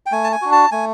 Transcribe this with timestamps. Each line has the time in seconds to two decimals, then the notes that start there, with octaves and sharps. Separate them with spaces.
0.06 G5
0.12 A3 G#5
0.24 A5
0.32 G#5
0.42 D4 F#4
0.52 A5
0.72 A3 G#5